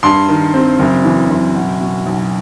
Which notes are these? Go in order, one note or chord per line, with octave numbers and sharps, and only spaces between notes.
G2 C6
D#3
C4
F#1
E3
F#1
B2
B2
B1